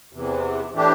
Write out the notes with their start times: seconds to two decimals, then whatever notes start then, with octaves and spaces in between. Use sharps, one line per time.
0.13 E2 C3 E3
0.73 A2 E3 A3 D4 G4